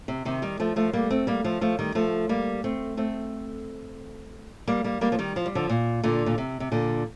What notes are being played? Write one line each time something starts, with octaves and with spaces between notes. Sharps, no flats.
C3
C3 D#3
D#3 G3
F3 A3
F3 A3
G3 A#3
A3 C4
G3 A#3
F3 A3
F3 A3
D#3 G3
F3 A3
G3 A#3
A3 C4
A3 C4
G3 A#3
G3 A#3
G3 A#3
F3
D#3 G3
F3
G3
D3 F3
A#2
A#2 D3
A#2
C3
C3
A#2 D3